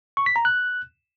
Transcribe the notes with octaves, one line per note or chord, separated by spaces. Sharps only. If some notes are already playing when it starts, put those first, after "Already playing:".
C#6
B6
A#5
F#6